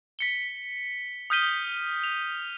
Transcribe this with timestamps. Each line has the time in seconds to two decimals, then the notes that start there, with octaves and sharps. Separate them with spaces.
0.19 B6 C#7 G7
1.30 D#6 F6 G6 B6 D#7 G7
2.03 F7